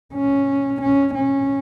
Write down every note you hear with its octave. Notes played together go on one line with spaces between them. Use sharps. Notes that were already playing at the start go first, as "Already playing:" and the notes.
C#4
C#4
C#4